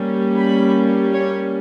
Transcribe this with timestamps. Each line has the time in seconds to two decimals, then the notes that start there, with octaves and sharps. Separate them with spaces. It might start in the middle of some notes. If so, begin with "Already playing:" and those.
Already playing: G3 A#3 C#4
0.38 B5
1.15 C#5